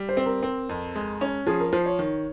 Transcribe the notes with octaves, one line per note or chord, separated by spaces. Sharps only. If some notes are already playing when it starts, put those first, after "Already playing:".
Already playing: G3
C5
C4
A#4
C4
F2
G#3
C#4
F3 G#4
A#4
F3 C5
C#5
D#3